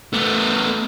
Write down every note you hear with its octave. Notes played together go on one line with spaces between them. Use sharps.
A3 B3